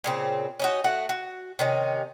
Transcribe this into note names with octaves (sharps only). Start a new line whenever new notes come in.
A#2 C#3 C4
C#4 D#4 F#4
A3 F#4 F#5
F#4
C3 D#3 C#4